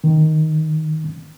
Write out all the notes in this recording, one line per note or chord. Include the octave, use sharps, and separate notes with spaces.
D#3